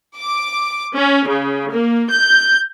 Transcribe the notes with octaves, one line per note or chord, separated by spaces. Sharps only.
D6
C#4
C#3
A#3
G6